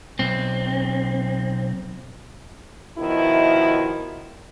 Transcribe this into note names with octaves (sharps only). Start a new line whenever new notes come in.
B1 C4
B2 D#3 F3 E4